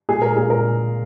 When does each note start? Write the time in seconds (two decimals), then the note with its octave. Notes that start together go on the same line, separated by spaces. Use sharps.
0.09 A#2 G#3 G#4
0.22 A#4
0.36 A#2 G#3 G#4
0.50 A#4